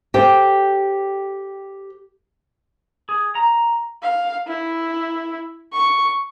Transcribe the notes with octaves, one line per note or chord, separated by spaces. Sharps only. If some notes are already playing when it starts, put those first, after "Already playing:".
G4 A4 C5 G5
G#4
A#5
F5
E4
C#6